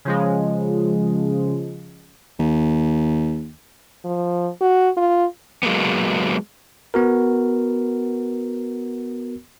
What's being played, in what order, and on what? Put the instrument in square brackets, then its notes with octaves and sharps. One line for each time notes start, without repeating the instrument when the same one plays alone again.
[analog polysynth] C#3 F3 G#3
[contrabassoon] D#2
[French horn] F3
F#4
F4
[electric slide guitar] F#3 G#3 A#3 B3
[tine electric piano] B3 F#4 A#4